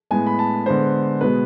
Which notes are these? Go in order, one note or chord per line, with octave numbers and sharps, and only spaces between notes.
A2 G#3 B3 G#5
B5
A5
D3 G#3 B3 C5
B2 G#3 B3 B4